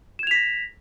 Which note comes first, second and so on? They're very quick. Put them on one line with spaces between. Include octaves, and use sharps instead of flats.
E7 G#6 F7 B6 A#6